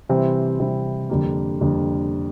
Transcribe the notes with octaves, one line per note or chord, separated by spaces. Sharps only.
C3 E3 G3 C4 E4
C3 E3 G3 C4 E4
F2 D3 G3 A#3
F2 D3 G3 A#3